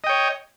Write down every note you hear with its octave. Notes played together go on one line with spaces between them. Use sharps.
C#5 D#5 G5